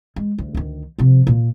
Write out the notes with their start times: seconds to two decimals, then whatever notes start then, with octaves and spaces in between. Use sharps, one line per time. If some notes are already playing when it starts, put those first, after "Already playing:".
0.16 G#3
0.38 D2
0.55 D2 D#3
0.98 C3 F3
1.27 A#2 A#3